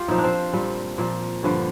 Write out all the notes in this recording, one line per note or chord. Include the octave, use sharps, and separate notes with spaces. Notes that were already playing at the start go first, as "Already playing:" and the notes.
Already playing: F4 G4
A#2 F3 D#4
D4
C4
A#2 G3
A#2 F3
G2 D3 F3 G3